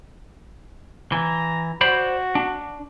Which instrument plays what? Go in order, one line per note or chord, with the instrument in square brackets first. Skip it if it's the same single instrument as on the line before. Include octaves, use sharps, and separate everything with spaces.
[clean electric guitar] E3 [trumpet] A#5
[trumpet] F#4 [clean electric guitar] C5 D5 B5
[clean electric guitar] D4